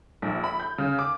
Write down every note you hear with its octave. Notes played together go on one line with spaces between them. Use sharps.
A#1
B5
G6
C#3
D6